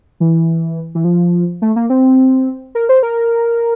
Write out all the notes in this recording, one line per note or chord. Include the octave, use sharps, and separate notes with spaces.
E3
E3
F3
A3
A#3
C4
A#4
C5
A#4